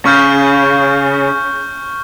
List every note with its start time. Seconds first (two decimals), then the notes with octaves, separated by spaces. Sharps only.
0.05 C#3 C#6 F6 G6